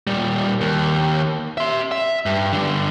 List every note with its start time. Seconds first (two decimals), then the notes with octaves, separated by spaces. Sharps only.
0.07 A#2 G3
0.61 D#2
1.58 E5 C6
1.92 E5
2.26 G2
2.53 G2 D3